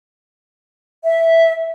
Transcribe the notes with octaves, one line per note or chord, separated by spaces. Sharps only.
E5